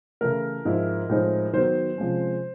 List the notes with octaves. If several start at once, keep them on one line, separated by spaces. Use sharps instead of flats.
C#3 E3 A3 A#4
G#2 F3 G#3 C4 E4
A2 F3 G#3 C4 D#4
D#3 F#3 B3 C5
C3 F3 G#3 C#4